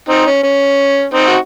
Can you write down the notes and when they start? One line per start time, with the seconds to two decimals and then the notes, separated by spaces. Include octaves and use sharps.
0.09 C4 D#4
0.26 C#4
0.43 C#4
1.13 C4 D#4
1.27 F#4